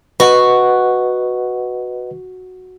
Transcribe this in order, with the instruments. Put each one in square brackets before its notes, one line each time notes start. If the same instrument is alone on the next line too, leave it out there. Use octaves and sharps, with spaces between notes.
[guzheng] F#4 [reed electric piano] B4 D#5 F#5